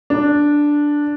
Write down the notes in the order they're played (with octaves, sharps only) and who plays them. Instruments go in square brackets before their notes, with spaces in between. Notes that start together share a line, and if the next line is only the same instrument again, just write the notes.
[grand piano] D4